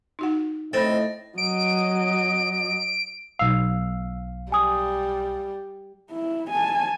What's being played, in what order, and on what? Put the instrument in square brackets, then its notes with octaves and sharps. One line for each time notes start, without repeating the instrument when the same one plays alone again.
[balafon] D#4 F#4 F#5
[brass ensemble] A2 D#5 [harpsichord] C4 [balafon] A4 C5 B5 [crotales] A6 A#6
[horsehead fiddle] F#3 D#5 [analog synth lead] D7
[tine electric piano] B1 F5 [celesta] E6
[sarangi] G3 [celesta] G#5 D#6
[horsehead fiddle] E4
G#5 A5